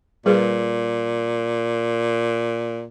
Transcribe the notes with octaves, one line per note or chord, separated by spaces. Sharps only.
A#2 G3 G#4 B4